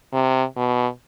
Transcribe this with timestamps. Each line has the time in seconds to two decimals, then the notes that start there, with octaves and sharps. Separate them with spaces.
0.13 C3
0.57 B2